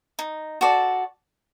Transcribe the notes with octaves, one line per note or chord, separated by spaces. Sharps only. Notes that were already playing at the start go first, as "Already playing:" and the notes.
D#4
F#4 A4 D5